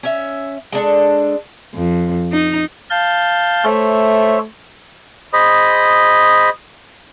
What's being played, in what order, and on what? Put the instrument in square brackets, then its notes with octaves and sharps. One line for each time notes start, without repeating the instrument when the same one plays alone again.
[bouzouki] C#4 E5
G#3 D4 A4
[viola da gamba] F2
D#4
[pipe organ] F5 A5 G6
[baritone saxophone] A3 [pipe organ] C5 C#5 E5
[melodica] G#4 C5 D#5 B5